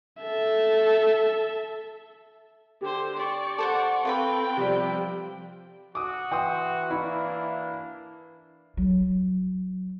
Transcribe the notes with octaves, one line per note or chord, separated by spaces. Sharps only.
A4 E5
D3 G4 C5
D5 C#6
A4 C5 F#5
C4 F4 A4 B4 G5 B5
C3 F3 G3
F#4 D6 D#6
E3 G5 C6 D#6
A#3 D4 E4 F5
F#3